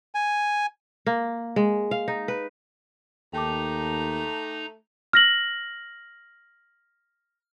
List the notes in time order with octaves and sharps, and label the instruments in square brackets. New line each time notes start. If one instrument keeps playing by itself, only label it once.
[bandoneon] G#5
[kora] A#3
G#3
F5
D#4
B4
[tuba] D#2 [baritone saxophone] A3 [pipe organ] D#4 A#5 [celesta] G5 A5 D6
[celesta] F6 A#6 F#7